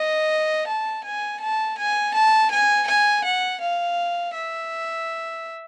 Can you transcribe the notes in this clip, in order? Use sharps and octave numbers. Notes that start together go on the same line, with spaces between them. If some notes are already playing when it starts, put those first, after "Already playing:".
Already playing: D#5
A5
G#5
A5
G#5
A5
G#5
G#5
F#5
F5
E5